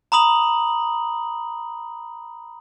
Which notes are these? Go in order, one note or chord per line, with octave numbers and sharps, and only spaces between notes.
A#5 B5 D#6 F#7